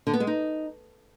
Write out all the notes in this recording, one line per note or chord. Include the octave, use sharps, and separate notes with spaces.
D3
B3
G#3
D#4